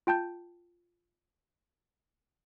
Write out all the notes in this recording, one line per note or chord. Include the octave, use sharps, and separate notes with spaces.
F4 G5 A5 G6